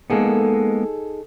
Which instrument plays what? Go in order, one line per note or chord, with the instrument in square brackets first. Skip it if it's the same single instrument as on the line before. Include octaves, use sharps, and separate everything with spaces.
[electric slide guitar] G#3 A#3 B3 [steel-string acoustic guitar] D#4 G#4 A4